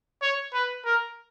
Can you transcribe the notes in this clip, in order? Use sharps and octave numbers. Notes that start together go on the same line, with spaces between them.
C#5
B4
A#4